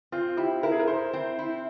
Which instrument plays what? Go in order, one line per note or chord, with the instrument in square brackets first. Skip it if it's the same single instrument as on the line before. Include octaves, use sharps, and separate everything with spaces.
[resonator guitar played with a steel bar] C4 [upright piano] F4
[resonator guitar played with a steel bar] E4 [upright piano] G4
[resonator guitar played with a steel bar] E4 [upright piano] A#4
[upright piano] G#4
A#4
[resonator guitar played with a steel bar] E4 [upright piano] C5
[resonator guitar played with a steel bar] C4
E4